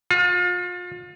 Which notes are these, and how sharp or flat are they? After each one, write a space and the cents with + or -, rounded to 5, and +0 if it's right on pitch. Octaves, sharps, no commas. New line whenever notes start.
F4 +35